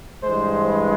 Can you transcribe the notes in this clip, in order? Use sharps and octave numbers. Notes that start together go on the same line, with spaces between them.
G2 E3 G#3 C5
B4